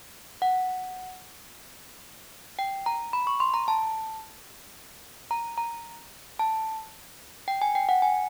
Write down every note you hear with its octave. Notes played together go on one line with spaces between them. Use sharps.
F#5
G5
A#5
B5
C#6
C6
A#5
A5
A#5
A#5
A5
G5
G#5
G5
F#5
G#5